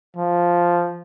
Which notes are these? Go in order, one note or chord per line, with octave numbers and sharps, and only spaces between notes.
F3